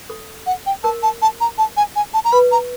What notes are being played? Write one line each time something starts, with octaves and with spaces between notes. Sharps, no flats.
A4
F#5
G5
A#4 A5
A5
A5
A#5
A5
G#5
G#5
A5
A#5
B4 B5
A#5